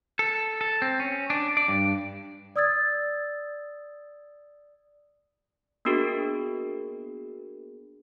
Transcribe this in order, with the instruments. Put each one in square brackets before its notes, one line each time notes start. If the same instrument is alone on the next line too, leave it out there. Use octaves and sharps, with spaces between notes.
[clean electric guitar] A4
A4
C4
C#4
D4
D5
G2
[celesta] D5 D#6 E6 G#6 A6
[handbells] A#3 B3 D4 F#4 G#4 A#4